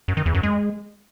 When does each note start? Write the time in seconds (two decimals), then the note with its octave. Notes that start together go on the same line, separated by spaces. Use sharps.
0.08 F#2
0.17 D#3
0.26 E2
0.34 F#2
0.43 G#3